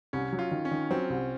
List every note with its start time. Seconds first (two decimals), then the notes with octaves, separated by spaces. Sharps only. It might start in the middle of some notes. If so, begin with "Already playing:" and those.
0.13 C2 C#4
0.32 F#3
0.39 F4
0.51 D#3
0.65 C#4
0.71 D#3
0.90 F#3 C4
1.10 C2